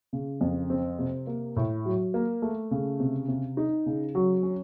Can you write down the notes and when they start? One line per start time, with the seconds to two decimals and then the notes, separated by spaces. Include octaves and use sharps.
0.13 C#3
0.41 F2
0.70 C4
0.99 C3
1.27 A#3
1.56 A2
1.85 F#3
2.14 A#3
2.42 A3
2.71 C#3
3.00 C3
3.28 C3
3.57 D#4
3.86 C#3
4.15 F#3
4.43 C#4